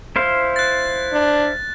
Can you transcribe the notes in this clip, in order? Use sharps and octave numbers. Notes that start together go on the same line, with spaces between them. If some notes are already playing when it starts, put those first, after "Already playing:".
E4 C5 F5
F#6 A6
D4